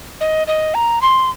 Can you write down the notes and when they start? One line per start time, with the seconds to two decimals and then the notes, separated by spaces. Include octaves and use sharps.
0.21 D#5
0.47 D#5
0.74 A#5
1.02 C6